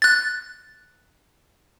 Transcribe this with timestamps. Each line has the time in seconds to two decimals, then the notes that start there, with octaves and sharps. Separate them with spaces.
0.02 F#6 A6